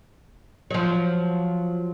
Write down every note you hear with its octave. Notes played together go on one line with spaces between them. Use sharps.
F3 F#3